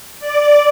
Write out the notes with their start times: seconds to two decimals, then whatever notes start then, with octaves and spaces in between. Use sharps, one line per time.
0.20 D5